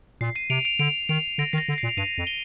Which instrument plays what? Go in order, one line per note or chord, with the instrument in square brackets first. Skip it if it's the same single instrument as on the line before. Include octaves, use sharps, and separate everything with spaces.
[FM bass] A#2 [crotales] C7
[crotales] C7 D#7
[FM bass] C3 [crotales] D7 F7
[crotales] D7 F7
[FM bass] D3 [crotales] D7 F7
[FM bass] D#3 [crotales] D7 F7
[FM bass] D3 [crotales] A#6 D7
[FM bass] D#3 [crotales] C7
[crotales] A#6
[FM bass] D3
[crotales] A#6
C7
[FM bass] A#2
[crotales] F7
[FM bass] G2 [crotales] C7 D#7
[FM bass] F2
[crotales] D#7 G7